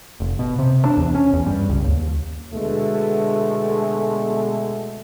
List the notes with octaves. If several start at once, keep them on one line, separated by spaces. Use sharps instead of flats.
F1
B2
C3
D4
E2
C#4
E2
G2
C#2
D#2
B2 D3 G#3 A3